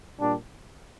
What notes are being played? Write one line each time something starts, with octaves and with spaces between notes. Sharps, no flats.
A#2 G3 D4